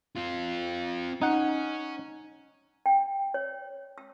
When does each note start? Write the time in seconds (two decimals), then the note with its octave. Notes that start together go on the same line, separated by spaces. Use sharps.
0.17 C4 F4
1.22 C#4 D#4 F#5
2.86 G5
3.34 C#5
3.98 E6